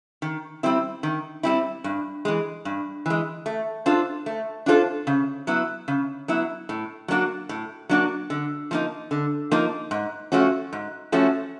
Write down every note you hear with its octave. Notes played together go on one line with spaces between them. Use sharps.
D#3
G3 C4 E4
D#3
G3 C4 E4
G2
E3 G#3
G2
E3 G#3
A3
D4 F4 A4 C5
A3
D4 F4 A4 C5
C#3
F#3 B3 E4
C#3
F#3 B3 E4
A2
F#3 A#3 D4 F#4
A2
F#3 A#3 D4 F#4
D3
F3 A#3 D#4
D3
F3 A#3 D#4
G#2
F3 A3 C#4 F#4
G#2
F3 A3 C#4 F#4